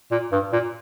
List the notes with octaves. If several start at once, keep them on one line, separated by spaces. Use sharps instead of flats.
A#2
G2
A#2